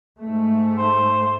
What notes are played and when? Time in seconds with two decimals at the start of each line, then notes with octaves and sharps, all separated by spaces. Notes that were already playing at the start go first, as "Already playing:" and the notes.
0.18 G#2 A3
0.78 C5